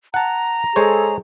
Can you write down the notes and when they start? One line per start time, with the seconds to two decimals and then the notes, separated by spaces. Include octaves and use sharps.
0.14 F#5 A5 A#5
0.76 G#3 G#4 A4 C5 C#5